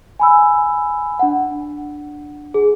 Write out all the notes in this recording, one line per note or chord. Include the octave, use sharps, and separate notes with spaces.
G#5 B5 E6
D4 F#5
G#4